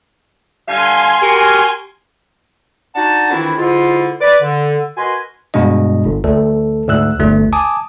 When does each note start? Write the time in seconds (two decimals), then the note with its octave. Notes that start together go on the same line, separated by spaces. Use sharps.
0.67 D3 G3 F5 G#5 C6
1.22 F#4 G4 A#4
2.95 D4 D#4 F#4 F#5 A5
3.30 F2 D#3 E3 C4 D4 E4
3.58 G#2 D3 E4 F4
4.21 B4 D5
4.42 D3
4.97 F#4 A#4 B4 D#5 G#5 C6
5.54 G2 B2 G#3 D4 D#5
6.05 G1
6.24 D2 A4
6.88 D2 G#2 E6 F#6
7.19 G1 D2 A3
7.53 G#5 A5 D6 D#6